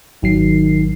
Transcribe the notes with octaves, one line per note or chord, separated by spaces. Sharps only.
G#1 D#3 F#3 C7